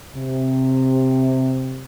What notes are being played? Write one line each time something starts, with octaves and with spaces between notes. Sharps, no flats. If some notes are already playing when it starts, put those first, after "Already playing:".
C3